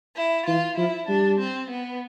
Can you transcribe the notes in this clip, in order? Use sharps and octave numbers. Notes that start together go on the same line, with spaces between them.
E4
E3 F4
F3 E4
G3 D4
C4
B3